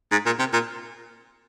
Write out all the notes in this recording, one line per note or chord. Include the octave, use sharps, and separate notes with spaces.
G#2
A#2
C3
A#2